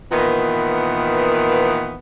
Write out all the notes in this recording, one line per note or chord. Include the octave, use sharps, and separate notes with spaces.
A#2 D#3 E3 B3